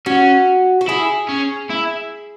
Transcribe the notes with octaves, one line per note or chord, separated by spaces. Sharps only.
C#4 F#4
F#4
E4 G#4
C#4
E4